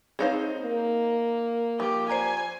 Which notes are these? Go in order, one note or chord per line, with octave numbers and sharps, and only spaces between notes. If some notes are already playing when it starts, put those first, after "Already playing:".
C4 D#4 G#4 C5 C#5 F5
A#3
F3 G4
C5 D5 G#5 A#5